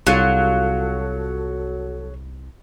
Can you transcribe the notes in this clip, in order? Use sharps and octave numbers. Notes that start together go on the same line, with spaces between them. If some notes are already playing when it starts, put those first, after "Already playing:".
C2 F#3 F4 G#4 A4